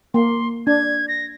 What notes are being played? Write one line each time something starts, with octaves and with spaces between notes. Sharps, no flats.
A#3 C6
D4 G#6
A#6